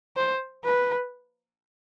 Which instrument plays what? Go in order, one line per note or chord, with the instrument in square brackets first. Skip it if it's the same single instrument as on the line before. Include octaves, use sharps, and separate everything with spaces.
[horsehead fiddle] C5
B4